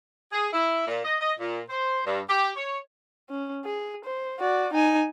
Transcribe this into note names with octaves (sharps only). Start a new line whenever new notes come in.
G#4
E4
A#2
D#5
D#5
A#2
C5
G2
G4
C#5
C#4
G#4
C5
F#4 D5
D#4 G#5